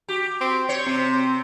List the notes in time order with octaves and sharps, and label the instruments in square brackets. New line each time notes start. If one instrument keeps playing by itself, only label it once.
[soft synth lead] F#4 [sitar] G4
[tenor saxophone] C4
[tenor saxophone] C5 [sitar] C#5 [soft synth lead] C#7
[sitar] C3 [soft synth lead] C4